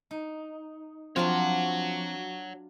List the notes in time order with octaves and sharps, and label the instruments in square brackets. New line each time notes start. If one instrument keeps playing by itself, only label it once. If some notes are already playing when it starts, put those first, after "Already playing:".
[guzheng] D#4
[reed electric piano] F3 C4 [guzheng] F#3 D4 F4 [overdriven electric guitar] C#5 F#5